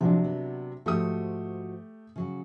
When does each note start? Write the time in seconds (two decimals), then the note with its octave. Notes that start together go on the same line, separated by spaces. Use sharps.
0.01 C3 F3 F#3 G#3 D4
0.24 B3
0.86 G#2 F3 A3 F#4 G4 D#6
2.16 C#3 F#3 F#4